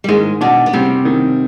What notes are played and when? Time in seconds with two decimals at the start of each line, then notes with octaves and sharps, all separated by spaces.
0.04 G3
0.08 G#2 D#3 G#3
0.41 B2 B3 D4
0.66 B3
0.73 C3 G3 C4
1.05 D#3